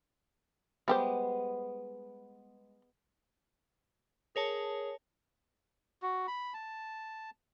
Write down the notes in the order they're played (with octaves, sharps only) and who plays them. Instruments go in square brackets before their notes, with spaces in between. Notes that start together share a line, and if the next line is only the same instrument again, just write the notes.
[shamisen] G3 G4 C5 [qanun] G#3 B3
[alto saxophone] G#4 [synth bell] A#4 C#5 A5
[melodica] F#4
B5
A5